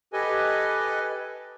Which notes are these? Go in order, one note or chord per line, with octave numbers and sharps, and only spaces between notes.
G4 A4 B4 D#5 G#5